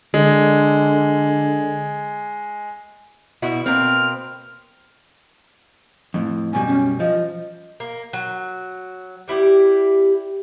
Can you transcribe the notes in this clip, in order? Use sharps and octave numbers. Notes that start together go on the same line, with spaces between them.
D3 G#3
B2 E4 F#4
B2 A#3 C4 F6
F2 A2
F#2 B2 G3 G#5
C#4
F3 D#5
A#3
F#3
G3 E4 F4 G4